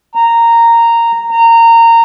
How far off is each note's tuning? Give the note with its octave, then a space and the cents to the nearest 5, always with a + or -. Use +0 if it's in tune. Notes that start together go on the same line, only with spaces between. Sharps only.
A#5 -10
A#5 -20